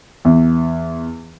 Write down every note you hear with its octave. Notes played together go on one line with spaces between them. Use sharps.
E2